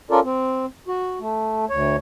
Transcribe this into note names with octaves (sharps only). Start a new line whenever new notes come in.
C#4 F4 A4 A#4 D5
C4
F#4
A3
D2 C#5